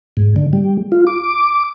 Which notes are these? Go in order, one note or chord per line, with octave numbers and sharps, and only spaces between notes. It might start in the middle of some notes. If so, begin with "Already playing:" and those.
G#2
D3
G3
F4
D6